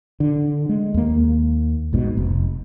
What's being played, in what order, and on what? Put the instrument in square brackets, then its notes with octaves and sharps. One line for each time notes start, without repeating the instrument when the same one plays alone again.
[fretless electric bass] D3
G#3
D#2 A#3
A#1 G#2 B2
F1